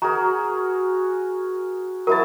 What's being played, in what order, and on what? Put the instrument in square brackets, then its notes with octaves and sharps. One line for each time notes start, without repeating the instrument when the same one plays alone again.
[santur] F#4 G#4 A#4 [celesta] A#5
[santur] F#3 E4 A5 [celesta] A#4